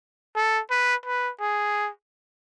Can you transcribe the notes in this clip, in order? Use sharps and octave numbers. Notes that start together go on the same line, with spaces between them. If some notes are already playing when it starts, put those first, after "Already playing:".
A4
B4
B4
G#4